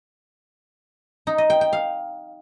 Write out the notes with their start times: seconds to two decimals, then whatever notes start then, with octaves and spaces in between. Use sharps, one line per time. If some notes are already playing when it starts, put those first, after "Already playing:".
1.27 D#4
1.38 D#5
1.50 G5
1.61 G5
1.73 F5